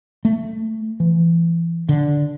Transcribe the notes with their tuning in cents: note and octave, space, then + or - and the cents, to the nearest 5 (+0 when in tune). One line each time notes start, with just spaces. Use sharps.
A3 +5
E3 +30
D3 -5